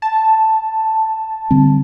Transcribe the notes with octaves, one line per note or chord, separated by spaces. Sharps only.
A5
D3 G3 C4